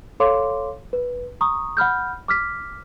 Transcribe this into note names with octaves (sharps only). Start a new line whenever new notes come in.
A4 C#5 F5 C6 D6
B4
A#5 C#6 D#6
F#5 B5 F6 G6
D6 F6 B6